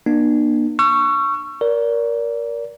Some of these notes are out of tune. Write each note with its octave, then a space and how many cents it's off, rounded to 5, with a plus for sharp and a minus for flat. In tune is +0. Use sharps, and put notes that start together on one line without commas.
A#3 +40 D4 +40
C#6 +0 E6 +45
A#4 +15 D5 -30